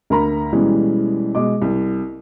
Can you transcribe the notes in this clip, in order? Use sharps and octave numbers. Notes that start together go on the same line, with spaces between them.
D2 A#4 A#5 B5
B2 E3 G3 G#3 C#4
B2 G#3 D#5 D6
C2